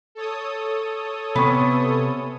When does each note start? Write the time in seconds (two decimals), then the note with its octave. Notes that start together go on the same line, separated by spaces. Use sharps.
0.15 A4 C#5 D#6
1.35 C3 B3 C#4 B5 C#6